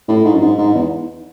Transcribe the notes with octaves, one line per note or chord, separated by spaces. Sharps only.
A2
G#2
F#2
G#2
G#2
E2